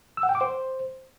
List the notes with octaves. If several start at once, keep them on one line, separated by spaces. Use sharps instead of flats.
E6
F#5
G5
D6
C5